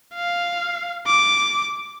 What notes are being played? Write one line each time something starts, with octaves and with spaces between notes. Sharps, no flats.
F5
D6